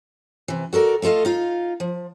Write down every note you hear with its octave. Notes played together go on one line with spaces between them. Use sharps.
C3 E3
F#4 A4 A#4 D5
A3 F4 A4 D#5 F5
D#4 F4 F5
F3